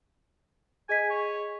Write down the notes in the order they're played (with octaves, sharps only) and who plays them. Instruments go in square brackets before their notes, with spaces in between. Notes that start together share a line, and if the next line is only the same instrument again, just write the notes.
[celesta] G#4 D#5 B6 [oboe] G#5
[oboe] C#5